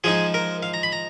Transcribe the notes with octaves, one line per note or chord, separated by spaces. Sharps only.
F3 G#3 D#4 G#4
A#4
F5
A#5
B5
A#5